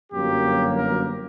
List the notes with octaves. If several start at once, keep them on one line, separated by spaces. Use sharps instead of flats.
G1 F#2 F#3 A#3 G4
A#4